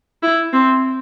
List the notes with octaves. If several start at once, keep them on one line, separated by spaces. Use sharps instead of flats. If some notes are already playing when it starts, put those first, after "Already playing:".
E4
C4